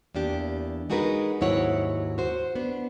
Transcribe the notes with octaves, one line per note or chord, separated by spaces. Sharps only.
E2 A#3 D4 G4
G#3 D#4 F#4 G#4 A#4 B4
D#2 G#2 F#3 E4 C#5 F#5
F#4 C5
B3 D4